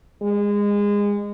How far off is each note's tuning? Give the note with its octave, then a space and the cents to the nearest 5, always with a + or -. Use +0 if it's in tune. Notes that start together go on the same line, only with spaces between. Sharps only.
G#3 -25